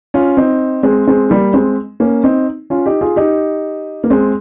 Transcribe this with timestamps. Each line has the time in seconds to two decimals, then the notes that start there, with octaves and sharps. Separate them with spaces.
0.14 C#4 F4
0.37 C4 D#4
0.83 G#3 C4
1.07 G#3 C4
1.30 G3 A#3
1.54 G#3 C4
2.00 A#3 C#4
2.24 C4 D#4
2.70 C#4 F4
2.86 D#4 G4
3.01 F4 G#4
3.16 D#4 G4
4.04 A#3
4.10 G#3 C4